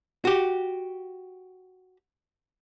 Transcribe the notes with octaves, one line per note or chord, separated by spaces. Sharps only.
F#4 G4